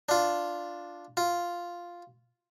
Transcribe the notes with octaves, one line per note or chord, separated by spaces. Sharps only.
D4 F4
F4